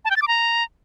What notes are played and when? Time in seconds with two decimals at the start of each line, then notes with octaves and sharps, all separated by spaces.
0.05 A5
0.11 G5
0.16 A6
0.22 D6
0.28 A#5